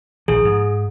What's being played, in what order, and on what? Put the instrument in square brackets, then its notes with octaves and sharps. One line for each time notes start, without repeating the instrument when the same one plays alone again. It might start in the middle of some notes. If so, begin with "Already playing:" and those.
[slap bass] A#1 D#3 F3 [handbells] G#4
[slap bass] G#2